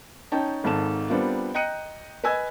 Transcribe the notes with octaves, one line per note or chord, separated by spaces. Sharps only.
C#4 D#4 G5 A5
G#1 G#2 D#3 A4 A5 E7
G3 B3 C4 D4 F4 A#4
D#5 G5 A#5 F#6 C#7 D#7
B4 D#5 G#5 E6 G#6